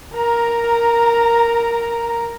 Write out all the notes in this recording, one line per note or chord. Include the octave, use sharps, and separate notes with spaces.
A#4 A#5